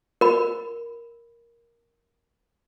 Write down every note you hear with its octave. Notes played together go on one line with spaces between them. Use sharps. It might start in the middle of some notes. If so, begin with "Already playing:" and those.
A#4 B5